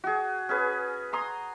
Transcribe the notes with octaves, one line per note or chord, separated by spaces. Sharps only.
F#4 G#4
C#4 G#4 B4
A#5 C6 D#6